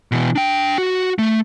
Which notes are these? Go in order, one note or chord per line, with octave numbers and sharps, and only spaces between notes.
B2 E3
D4 G5
F#4
A3